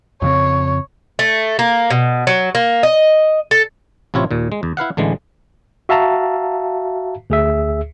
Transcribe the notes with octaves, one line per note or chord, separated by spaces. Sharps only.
F2 C#3 C4 C#5
A3
A#3
B2
F#3
A#3
D#5
A4
A1 C3 E4 F4 C#5
D#2 A#2
G#3
E2
E4 B4 F5 F#5
A1 D3 E3 G#3
F#4 E5 F5 A5 A#5
D2 G#4 E5